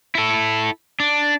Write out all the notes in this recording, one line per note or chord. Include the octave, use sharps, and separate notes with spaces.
E4 A4
D4